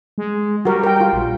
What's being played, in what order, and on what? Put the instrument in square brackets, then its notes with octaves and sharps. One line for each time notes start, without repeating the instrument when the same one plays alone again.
[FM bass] G#3
[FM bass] G3 [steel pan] F#4 A#4
[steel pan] A#4 G5
F4 G5
[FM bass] A#1